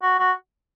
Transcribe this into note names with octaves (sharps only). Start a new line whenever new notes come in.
F#4
F#4